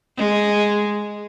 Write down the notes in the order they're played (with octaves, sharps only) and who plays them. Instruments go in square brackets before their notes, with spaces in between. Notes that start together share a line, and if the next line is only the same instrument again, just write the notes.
[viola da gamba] G#3